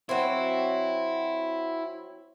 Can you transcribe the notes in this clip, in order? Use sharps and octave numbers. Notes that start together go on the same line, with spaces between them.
F#3 C4 E4